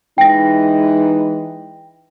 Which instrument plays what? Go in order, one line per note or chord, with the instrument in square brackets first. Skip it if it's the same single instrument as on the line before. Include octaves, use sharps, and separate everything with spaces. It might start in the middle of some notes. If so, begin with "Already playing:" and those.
[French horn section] E3 G#3 D#4 [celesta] G5 A#6